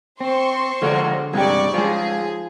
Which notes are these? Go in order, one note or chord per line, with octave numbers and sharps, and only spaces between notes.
C4 C5 C6 C#6
D3 F3 G#3 F#4 D5
G2 C3 G3 G#3 D#4 G#4 D5 C#6
F3 G#3 F4 G#4